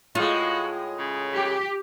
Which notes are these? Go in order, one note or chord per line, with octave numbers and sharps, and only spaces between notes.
A2 G#3 F4 F#4
C#3
G4